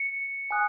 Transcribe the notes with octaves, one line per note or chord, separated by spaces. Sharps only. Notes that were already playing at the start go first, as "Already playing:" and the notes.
Already playing: C#7
G#5 D#6 F#6